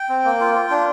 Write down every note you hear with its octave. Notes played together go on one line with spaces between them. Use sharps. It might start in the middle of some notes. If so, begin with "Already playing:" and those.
Already playing: G5
C4
A#3
F4
F4
D4